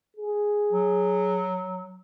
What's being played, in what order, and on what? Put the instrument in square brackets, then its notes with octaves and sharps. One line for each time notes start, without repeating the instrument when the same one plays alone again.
[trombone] G#4
[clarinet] F#3